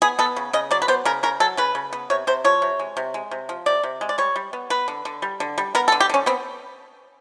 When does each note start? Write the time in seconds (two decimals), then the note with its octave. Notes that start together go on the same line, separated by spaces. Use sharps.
0.02 B3 G#4
0.19 B3 A4
0.36 C#3
0.53 C#3 D#5
0.71 F#3 D5
0.82 B4
0.88 B3 C5
1.05 C#3 A#4
1.23 C#3 A#4
1.40 F#3 A4
1.57 C#3 B4
1.75 C#3
1.93 B3
2.10 C3 C#5
2.27 C3 C5
2.44 F3 C#5
2.62 C3
2.79 G#3
2.97 C3
3.14 G#3
3.31 C3
3.49 F3
3.66 C3 D5
3.83 C3
4.01 G#3
4.09 D5
4.18 G3 C#5
4.36 G3
4.53 B3
4.70 B3 B4
4.88 D3
5.05 D3
5.22 G3
5.40 D3
5.58 G3
5.75 B3 A#4
5.88 A4
5.92 D3
6.00 G4
6.10 D3 C#4
6.26 B3 C4